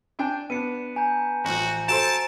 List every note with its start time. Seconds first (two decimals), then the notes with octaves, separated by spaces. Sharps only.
0.19 D4 G5 G#5
0.50 B3 D4 C#7 D#7
0.96 G#5 A#5 G6
1.45 A1 F3 F#4
1.88 F#4 A4 C5 A5 A#5 D7